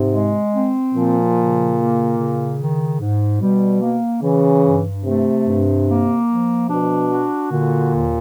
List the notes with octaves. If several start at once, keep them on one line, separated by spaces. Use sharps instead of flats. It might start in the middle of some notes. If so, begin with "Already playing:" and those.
Already playing: G#2 C3
G#3
C4
A#2 F3
C#3
A#3
C#3
D#3
G#2
B2 G3
A#3
C#3 E3
G2
C3 A3
G2
A#3
F3
B2 D4
F#4
A#2 D3
D#2